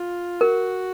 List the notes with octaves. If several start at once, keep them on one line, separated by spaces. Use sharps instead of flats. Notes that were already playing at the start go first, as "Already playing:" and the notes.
Already playing: F4
F#4 A#4